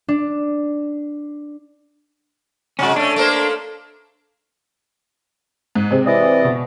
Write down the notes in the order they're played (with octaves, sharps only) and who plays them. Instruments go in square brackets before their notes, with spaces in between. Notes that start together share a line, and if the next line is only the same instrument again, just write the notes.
[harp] D4
[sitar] C3 G#3 [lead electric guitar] C#4 F#4
[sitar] A3 C#4 [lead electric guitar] D4
[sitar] A3 A#3 C5
[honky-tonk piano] G#2
C3 G#3 C4
[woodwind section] E3 D5 D#5
[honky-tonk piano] B2